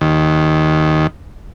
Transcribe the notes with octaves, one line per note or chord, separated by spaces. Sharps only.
D#2